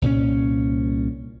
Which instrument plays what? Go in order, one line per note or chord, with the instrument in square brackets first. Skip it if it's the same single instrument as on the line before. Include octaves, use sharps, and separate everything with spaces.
[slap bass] C2 A#2 G3 C#4